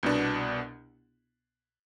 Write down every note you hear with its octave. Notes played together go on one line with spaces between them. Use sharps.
C2 B2 B3 D4